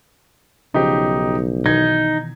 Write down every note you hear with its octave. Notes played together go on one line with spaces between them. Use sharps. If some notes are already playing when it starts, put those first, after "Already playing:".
B1 C#3 F3 D#4 G4
B2 D#3 E3 D#4 G#6